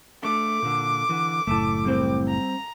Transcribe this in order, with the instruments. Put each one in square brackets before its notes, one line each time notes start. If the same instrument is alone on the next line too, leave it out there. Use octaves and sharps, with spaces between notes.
[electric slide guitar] A3 D4 [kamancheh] D6
[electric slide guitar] A#2 D3
D3 E3
[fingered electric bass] F#1 A2 [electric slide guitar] A3 A5
[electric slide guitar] G3 C4 C5
[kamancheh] A#5